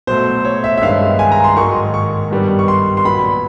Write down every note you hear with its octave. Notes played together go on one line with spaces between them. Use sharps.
B2 F#3 A3 C5
C#5
E5
E5
G2 D#3 G#3 B3 F5
G#5
A#5
C6
G#2 D#3 F#3 A#3 C#6
C#6
G2 D#3 G3 B3
C#6
C6
C6
A#2 F#3 B3 B5